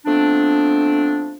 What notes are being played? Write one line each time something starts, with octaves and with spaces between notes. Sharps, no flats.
F3 A3 B3 C4 D4